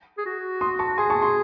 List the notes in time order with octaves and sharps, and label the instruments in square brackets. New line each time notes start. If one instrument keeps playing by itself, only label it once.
[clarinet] G#4
F#4
[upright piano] C6 D#6
A5 C#6
[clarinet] G#4 [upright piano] G#5 C6
[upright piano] A5 C#6
G#5 C6